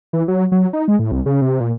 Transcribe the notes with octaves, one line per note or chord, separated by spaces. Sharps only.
E3
F#3
F#3
D#4
G#3
A2
C2
C#3
C3
A#2